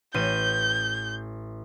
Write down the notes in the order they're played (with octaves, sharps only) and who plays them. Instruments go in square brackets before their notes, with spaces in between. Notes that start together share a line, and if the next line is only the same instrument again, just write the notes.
[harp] A1 D#7 [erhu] G6